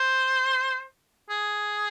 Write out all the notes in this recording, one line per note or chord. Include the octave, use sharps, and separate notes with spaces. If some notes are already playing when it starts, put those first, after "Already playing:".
Already playing: C5
G#4